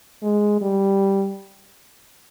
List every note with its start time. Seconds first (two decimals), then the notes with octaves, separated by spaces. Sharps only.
0.23 G#3
0.61 G3